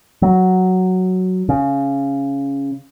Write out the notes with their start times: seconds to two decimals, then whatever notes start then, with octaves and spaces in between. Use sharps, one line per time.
0.22 F#3
1.49 C#3